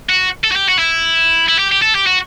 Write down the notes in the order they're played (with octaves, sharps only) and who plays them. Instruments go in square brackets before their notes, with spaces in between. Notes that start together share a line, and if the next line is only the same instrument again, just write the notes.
[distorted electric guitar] F#4
A4
F#4
G4
F#4
E4
E4
G4
G4
A4
G4
F#4